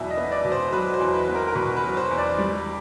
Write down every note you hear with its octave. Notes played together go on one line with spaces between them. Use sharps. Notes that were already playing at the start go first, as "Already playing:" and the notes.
Already playing: E2 B2 F#3 B3 D5 E5
D#5
B3
D5
B2
C5
F#3 B4
C5
E2
B4
B3
A#4
A#4
B2 B4
B4
F#3
C5
E2
D5
G3